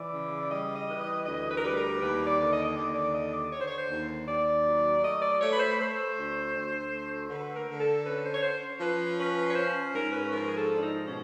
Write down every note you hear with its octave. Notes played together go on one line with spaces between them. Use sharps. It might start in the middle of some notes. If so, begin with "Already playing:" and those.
Already playing: E3 D5
C#3
G3 D#5
D#5
E3
D#5
D2 D#5
B4
A#4
G3 B4
A#4
D#2 B4
D5
D3
D#5
D#5
D#2 D5
D5
D3 D#5
D5
D3 C#5
C5
C#5
C5
D#2
D#2 D5
F#3
A3 D#5
D5
A3 C#5
B4
C5
B4
A3 C5
D2
D2
A3
D3 B4
A#4
D3
A4
C#4 B4
C5
C#5
C#4 C5
F3 B4
C#4 B4
C#5
C#4 C5
G#2 A#4
B4
F3 A#4
G#4
A4
G#2
D4
D#4
B2 C#4